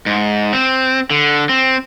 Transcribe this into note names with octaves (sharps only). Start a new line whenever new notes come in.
G#2
C4
D3
C4